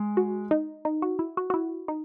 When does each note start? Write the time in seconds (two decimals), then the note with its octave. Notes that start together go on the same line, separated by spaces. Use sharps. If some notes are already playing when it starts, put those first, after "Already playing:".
Already playing: G#3
0.17 F#4
0.51 D#4
0.85 D#4
1.02 F#4
1.19 E4
1.37 F#4
1.50 F#4
1.54 E4
1.88 D#4